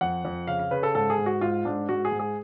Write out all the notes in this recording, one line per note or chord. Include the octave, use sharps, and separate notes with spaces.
F2 F#5
F2
C#3 F5
F5
C#3 B4
A4
G#2 A4
G#4
G#2
F#4
G#2 F4
G#2 D4
G#2 F#4
G#4
G#2
G#4